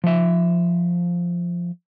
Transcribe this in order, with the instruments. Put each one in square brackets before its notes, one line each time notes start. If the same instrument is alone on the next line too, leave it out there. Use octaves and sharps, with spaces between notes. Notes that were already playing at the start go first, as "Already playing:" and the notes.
[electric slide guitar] F3 E5